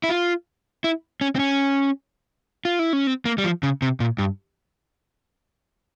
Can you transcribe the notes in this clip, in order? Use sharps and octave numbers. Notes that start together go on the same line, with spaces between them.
E4
F4
E4
C#4
C4
C#4
F4
E4
C#4
C4
A#3
G3
F3
C#3
C3
A#2
G2